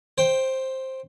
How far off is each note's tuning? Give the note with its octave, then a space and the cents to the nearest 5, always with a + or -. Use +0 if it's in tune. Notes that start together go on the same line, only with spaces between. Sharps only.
C5 +10 G5 +0